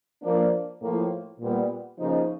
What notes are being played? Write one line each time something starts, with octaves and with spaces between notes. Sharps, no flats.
F3 A#3 D4
A2 F3 A#3
A#2 G3 B3
C#3 F3 A#3 D#4